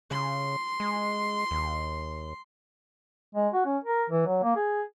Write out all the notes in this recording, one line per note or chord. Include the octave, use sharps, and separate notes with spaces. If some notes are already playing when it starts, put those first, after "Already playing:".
C#3 C6
G#3
D#2
G#3
F#4
C#4
A#4
E3
F#3
A#3
G#4